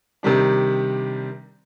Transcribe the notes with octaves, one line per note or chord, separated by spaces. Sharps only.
C3 D#3 G3 D4